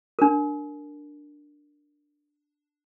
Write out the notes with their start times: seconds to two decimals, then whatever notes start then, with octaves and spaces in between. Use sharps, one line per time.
0.19 D4 A#4